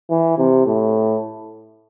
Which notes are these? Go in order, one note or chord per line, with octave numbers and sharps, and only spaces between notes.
E3
C3
A2